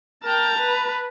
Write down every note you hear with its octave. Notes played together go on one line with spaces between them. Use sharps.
A#4 G5 A5 A#5
B4